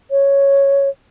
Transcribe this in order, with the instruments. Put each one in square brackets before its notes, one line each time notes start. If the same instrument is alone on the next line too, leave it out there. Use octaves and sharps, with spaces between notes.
[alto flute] C#5